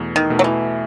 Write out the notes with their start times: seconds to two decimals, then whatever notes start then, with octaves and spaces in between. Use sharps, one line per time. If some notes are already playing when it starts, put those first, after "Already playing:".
Already playing: E2 B2 A3
0.16 D#3
0.30 B2 A3
0.39 F#3
0.44 E3